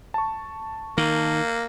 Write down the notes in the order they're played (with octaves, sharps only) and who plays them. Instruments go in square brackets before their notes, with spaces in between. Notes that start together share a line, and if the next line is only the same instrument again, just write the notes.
[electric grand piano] A5 C#6
[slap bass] D#3 [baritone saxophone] A#3